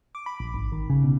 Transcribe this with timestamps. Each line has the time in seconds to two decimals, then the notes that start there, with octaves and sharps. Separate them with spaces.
0.15 D6
0.26 B5
0.40 A#1
0.54 G#1
0.72 D#3
0.90 C#3
1.04 B2